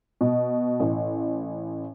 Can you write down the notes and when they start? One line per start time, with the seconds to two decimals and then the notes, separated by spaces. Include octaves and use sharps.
0.21 B2
0.80 A1